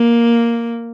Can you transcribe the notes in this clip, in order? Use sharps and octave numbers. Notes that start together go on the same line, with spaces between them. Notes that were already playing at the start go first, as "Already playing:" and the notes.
Already playing: A#3